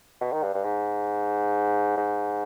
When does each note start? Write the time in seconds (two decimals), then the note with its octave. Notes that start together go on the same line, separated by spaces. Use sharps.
0.21 B2
0.32 D#3
0.43 G2
0.54 G2
0.64 G#2
1.97 G#2